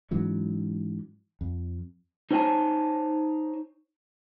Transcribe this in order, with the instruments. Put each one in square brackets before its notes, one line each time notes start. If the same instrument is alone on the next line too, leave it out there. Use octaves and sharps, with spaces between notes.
[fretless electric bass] G#2 E3 F#3 C#4
F2
[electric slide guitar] D#4 C5 C#5 F#5 G#5 A5